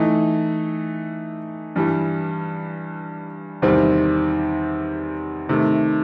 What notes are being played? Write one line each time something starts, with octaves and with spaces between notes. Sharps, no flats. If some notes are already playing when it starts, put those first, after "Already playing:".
Already playing: E3 A3 D#4
G2 E3 G3
E2 C3 D#3 G3 C4
C3 D#3 A3